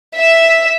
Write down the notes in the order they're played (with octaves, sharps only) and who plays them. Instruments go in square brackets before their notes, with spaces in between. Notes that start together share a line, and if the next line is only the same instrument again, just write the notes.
[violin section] E5